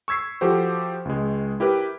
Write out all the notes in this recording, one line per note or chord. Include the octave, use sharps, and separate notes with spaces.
C#6 E6 G#6 B6 C7
F3 F#4 G4 A4 C5
C#2 G#3
E4 G4 A#4 B4